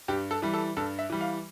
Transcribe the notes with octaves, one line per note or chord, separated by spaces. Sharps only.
G2 G4
A4
E3 G3
A4
G2 A4
E5
E3 G3
F5